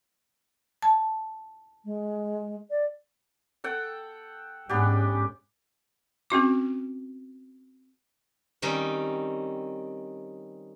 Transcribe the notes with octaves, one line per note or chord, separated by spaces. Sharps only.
A5
G#3
D5
A4 F#5 G5
G#2 G#3 B3 C#4 D4 G4
C4 C#4 F#4 D6
D#3 G3 C4 C#4 D#4